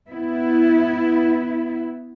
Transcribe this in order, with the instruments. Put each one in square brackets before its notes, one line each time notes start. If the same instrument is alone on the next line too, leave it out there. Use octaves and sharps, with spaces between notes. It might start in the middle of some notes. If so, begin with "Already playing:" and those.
[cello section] B3 E4